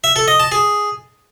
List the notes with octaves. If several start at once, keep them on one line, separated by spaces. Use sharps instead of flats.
E5
A4
D#5
A5
G#4